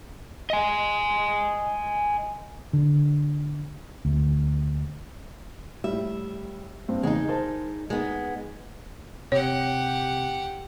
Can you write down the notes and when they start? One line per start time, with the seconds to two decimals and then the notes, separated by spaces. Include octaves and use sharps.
0.50 D#5 G#5
2.73 D3
4.05 D2
5.84 A2 G3 E5
6.89 G2 C4
7.03 E2 C#3 G#3 D#4 D#5
7.28 A#4 C5 A5
7.90 G#3 B3 D#4
9.32 C3 G4 C#5 F#5